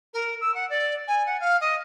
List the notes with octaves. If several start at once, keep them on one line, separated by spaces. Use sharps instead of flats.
A#4
E6
F#5
D5
G#5
F#5
F5
D#5